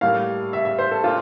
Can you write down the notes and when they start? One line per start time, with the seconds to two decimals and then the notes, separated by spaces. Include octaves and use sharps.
0.01 A2 G3 A#3 F5
0.53 E5
0.65 E5
0.79 C5
0.91 A4
1.04 A#2 F4